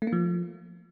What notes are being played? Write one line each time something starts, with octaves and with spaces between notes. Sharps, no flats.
A3
A#3
F3